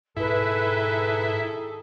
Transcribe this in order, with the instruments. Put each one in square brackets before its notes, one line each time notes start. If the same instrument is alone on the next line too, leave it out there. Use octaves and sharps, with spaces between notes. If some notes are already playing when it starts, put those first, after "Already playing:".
[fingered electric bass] G#2 B2 [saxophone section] D#3 G#4 A4 [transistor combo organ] E4 [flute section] B4